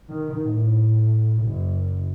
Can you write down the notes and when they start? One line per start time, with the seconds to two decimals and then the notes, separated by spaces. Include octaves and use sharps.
0.10 D#3
0.44 A2
1.42 F#1